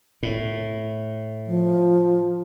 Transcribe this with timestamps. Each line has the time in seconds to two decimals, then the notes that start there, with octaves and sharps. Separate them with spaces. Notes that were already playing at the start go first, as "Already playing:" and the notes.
0.23 A2
1.47 F3